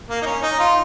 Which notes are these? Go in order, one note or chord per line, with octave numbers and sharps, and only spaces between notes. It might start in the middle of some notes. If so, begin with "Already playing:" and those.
A#3
D#4
C#4
D#4
F4